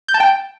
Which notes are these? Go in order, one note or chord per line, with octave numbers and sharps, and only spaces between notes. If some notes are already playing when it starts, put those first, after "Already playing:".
G6
A5
G5